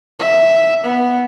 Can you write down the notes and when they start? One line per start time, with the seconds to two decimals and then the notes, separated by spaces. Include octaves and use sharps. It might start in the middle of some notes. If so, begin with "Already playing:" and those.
0.19 E5
0.83 B3